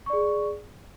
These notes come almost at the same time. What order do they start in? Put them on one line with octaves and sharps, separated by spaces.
C#6 D5 G#4